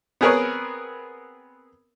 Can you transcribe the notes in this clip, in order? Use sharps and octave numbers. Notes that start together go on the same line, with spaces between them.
B3 C4 G#4 A#4 B4 C#5